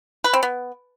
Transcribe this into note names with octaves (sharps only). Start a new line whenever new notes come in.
B4
C4
B3